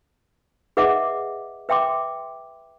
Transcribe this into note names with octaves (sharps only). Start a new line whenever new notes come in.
G#4 B4 D#5 E5 F#5 D6
B4 E5 G5 C6 D6